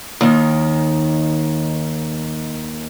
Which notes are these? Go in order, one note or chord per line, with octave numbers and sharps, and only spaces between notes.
D#2 D#3